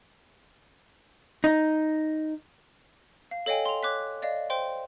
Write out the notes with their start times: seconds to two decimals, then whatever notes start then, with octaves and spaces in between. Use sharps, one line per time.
1.44 D#4
3.31 F5
3.46 A4 C#5 D#5 F5 G5 G#5
3.65 C6 F7
3.83 C#5 D6 F#6 B6
4.22 D5 D#5 F5
4.50 C5 G5 C6